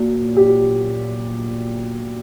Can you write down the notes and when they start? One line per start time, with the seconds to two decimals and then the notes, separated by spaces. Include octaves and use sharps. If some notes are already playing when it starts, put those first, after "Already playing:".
Already playing: A#2 F#3
0.37 G4